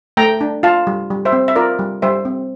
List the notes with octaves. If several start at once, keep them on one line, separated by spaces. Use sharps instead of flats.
A3 G5 A#5
D4
F4 F5 A5
G3
G3
C5 E5
C4
E5
F4 A#4 D5
G3
G3 C5 E5
C4